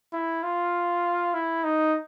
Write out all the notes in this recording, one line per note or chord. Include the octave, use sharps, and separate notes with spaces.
E4
F4
E4
D#4